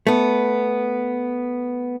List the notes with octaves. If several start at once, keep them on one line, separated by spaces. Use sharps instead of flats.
A3 B3